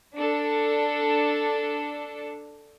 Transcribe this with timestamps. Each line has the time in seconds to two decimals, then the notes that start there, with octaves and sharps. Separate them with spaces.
0.16 D4 A4